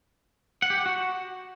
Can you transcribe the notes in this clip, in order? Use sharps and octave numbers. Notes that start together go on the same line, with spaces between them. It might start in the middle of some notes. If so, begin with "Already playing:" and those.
F#5
G4
F#5
F#4